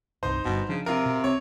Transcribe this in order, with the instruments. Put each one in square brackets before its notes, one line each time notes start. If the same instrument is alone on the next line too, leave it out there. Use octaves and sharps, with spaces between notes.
[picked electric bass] G1 C2 [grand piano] D#4 C5
[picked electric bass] G1 G2 [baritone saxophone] B2
[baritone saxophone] C#3 [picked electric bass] F3 D4
[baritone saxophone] C3 [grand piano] F4 A#4
[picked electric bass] B2
[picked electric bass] C4 [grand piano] C#5